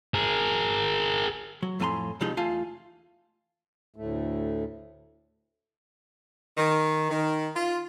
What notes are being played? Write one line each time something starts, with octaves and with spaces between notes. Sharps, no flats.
G#4 A#4
F#3
F2 A2 F3 G#5 A#5 C6
C2 F3 G3 G#3 D#4 D#5
E2 A3 F4 F5 G#5 A5
D2 A2 A3
D#3
D#3
F4